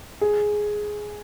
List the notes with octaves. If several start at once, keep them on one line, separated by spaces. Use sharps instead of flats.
G#4